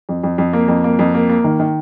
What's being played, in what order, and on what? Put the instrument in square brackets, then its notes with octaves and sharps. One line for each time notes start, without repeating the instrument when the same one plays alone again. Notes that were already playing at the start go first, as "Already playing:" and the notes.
[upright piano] F2
F2
F2
A#3
F2
A#3
F2
A#3
A#3
D#3
D#3